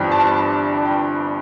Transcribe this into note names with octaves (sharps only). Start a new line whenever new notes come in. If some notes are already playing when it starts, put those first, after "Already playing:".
Already playing: G1 G2 E3 G3 C4
A5
G5